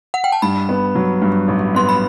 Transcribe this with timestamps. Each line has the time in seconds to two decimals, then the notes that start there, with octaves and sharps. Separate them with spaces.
0.14 F#5
0.24 G5
0.32 A5
0.42 G2 B5
0.69 B3
0.95 F#3
1.22 G2
1.48 A1
1.75 B3 C6
1.89 B5